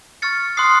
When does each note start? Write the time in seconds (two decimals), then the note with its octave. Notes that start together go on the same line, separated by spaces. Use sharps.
0.22 C#6 F6 A6 C#7
0.57 C6 D#6 F#6 C7